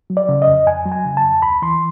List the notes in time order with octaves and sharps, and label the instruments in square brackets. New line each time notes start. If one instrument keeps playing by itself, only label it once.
[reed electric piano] F#3
D5
C#3
D#5
F2
F2 G#5
F#3
G#5
C#3
A5
F2
D2 B5
E3 C6